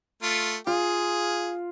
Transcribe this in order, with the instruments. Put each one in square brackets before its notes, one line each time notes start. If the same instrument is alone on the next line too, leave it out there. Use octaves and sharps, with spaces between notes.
[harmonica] A3 F4
[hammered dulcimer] F4 [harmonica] G#4